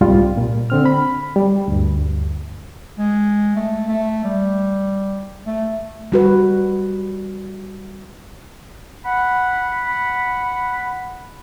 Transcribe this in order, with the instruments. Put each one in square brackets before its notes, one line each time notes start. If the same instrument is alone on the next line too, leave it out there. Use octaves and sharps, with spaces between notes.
[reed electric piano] C2 G#2 G3 F4
A#2
D3 C4 F6
B5
G3
D2 G2
[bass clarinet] G#3
A3
A3
G3
A3
[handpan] G3 F#4 B4
[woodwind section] F#5 B5